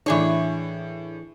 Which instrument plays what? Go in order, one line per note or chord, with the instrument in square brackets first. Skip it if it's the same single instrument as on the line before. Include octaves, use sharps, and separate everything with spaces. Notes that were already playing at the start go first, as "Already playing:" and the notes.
[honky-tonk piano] A2 D4 [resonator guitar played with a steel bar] E3 G#4 C#5